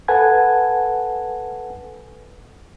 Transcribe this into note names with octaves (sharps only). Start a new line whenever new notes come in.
A4 B4 F#5 G#5 A5 G#6